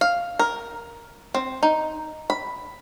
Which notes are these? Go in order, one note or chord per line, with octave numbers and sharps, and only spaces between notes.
F5
A#4
C4
D#4
B5